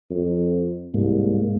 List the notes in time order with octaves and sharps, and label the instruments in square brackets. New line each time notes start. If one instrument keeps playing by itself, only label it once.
[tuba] F2
[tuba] C2 [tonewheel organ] G#2 G#3 A#3